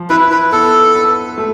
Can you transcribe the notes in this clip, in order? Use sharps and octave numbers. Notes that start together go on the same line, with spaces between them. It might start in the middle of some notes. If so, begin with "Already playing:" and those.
Already playing: F3
E4 B4
B4
B3 A4
B4
A3